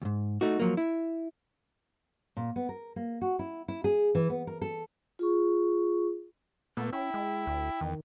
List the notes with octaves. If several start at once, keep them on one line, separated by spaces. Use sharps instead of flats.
D2 G#2
A3 D#4 F#4
F3 F#3 A#3
E4
A#2
B3
A#4
A#3
F#4
E4
E4
G#4
E3
B3
A#4
A4
F4 G#4 C#6
A#2 A3 B3
C#4 E4 G5
G#3
D2
E2 D#3